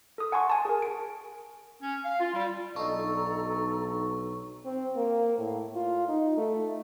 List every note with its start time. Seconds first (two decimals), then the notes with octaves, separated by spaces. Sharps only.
0.18 A4 D#6
0.32 F#5 G#5 A5 C6 C#6
0.50 G#5 A5
0.65 G#4 A#4
0.82 D7
1.82 C#4
2.04 F5
2.19 F4
2.33 G3
2.76 B1 D4 D#4 A4 A#5 C#6 E6
4.66 C4
4.96 A#3
5.38 A2
5.75 F4
6.08 D#4
6.38 A3